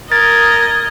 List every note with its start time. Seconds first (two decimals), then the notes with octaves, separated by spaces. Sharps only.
0.12 A#4 D#5 G#6 A6